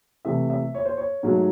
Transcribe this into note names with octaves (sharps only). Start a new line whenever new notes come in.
C3 E3 A3 E5
E5
C#5
C5
C#5
G#2 F#3 A3